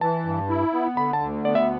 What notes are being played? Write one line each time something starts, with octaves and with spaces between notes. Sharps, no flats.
E3 A5
G2
E4
B3
D3 B5
A5
D2
B3 D5
E5